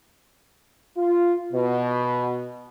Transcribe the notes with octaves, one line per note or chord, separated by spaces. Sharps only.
F4
B2